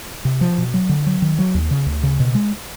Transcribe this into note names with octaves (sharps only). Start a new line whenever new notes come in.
C3
F3
B2
F#3
D3
F#3
D#3
F#3
D#2
C#3
D2
C#3
B2
G#3